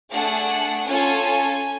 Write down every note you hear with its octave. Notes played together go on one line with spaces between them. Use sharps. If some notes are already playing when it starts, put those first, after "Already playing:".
A3 D4 G#4 F#5
C#4 F4 A4 G#5
G#5